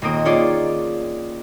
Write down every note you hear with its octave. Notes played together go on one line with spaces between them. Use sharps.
D#1 D#3 A#3 C4 D#6 D7
A#3 C#4 F4 G#4 C#5 D5